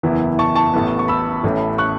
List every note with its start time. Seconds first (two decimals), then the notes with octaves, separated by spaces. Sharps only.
0.03 F#1 E2 E3 B3 E4
0.39 A5 C#6
0.55 A5 C#6
0.74 A1 A2 E3 B3
0.99 C#6
1.08 B5 E6
1.43 A1 A2 E3 C#4
1.78 C#6 F#6